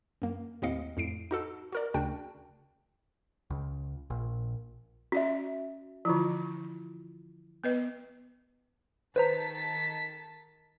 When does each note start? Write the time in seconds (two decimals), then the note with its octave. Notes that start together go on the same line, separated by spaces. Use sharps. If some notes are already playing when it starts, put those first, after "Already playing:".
0.22 F#2 A#3
0.62 D#2 A2 C4 D#5 F5 C#7
0.97 F2 A2 C7 D7
1.31 D#4 F#4 A4
1.72 F#4 A#4 D5
1.94 D2 C#3 D4 F#4 G5
3.50 C#2
4.10 A#1
5.12 C#4 F#4 D5 E5
6.05 D3 E3 F3 E4 F4
7.64 B3 B4 D#5
9.16 D#3 B4 C5 A5 A#5 B6